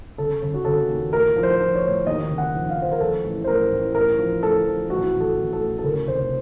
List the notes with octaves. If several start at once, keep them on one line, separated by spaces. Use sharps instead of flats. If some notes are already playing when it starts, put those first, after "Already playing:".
C#3 A4
C#3
F#4
C#3 A4
D#2
A2 A#4
F3
C5
F3
C#5
A2
D#2 D#5
C#3
F#5
F3
F5
F3 C5
A#4
F3 A4
A1
C5
A2 A#4
A1
A2 A#4
F3
A2 A4
F3
A1 F#4
A1
A4
A1
A4
A2
A4
C#3 A#4
F1 C5